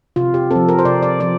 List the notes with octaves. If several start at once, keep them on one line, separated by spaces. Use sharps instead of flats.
C3 F4
G4
F3 C4 A4
A#4
C5
C3 D5
D5
F3 C4 D5